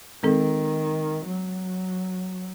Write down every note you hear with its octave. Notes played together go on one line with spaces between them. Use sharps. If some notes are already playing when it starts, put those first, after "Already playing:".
D#3 G#3 C4 A4
F#3